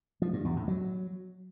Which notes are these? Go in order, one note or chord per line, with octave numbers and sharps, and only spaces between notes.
F3
G2
E2
A2
F#3